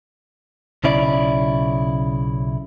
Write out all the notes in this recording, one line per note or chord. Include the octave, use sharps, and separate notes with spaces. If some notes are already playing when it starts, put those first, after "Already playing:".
B1 C#3 E4 D5